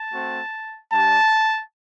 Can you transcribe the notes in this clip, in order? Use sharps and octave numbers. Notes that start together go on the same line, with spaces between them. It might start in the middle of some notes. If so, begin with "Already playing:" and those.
Already playing: A5
A3 C4 F#4
G3 D4 G4 A5